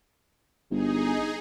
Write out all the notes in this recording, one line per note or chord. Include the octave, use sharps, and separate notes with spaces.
G1 D#4 G#4